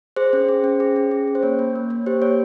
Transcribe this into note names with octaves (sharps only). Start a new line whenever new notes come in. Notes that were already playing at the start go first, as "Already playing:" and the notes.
G#4 C5
C#4
G#4
C#4
G#4
C#4
G#4
C#4
C5
A#3 C#5
A#3
A#3
A#3
G4 C5
A#3 C#5